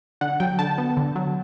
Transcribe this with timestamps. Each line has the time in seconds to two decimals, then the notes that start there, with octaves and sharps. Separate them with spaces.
0.21 D3 F#5
0.40 F#3 G5
0.59 D3 A5
0.78 B3
0.97 D3
1.16 F#3